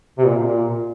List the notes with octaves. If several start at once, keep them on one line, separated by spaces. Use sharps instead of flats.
C3
A#2
A#2